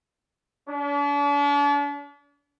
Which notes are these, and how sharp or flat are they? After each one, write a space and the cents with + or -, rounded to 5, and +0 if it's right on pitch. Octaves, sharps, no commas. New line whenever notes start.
D4 -40 D5 -45